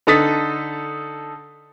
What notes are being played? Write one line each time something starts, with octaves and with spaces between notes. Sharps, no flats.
D3 D#4 A4 D#6 A6 B6